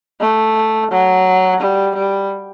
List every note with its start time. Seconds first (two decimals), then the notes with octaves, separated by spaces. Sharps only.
0.21 A3
0.91 F#3
1.60 G3
1.95 G3